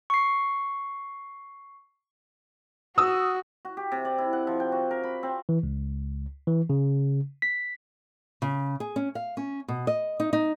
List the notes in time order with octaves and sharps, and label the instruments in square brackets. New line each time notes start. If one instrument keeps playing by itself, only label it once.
[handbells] C#6 C7
[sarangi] F#4 [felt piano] D#6 E6
[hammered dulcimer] F#4
G4
C3
D5
E4
F#5
F3
G5
F#4
A#4
B5
C4
[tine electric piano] E3
C#2
E3
C#3
B6
[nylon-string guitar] C#3
G#4
C#4
F5
C#4
B2
D#5
D#4
D#4